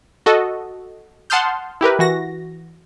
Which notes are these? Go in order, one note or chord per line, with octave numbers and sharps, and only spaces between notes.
F#4 A4 D#5
F#5 A5 C6 D#6 F6 G6
E4 G4 A#4 B4
E3 F#4 A#6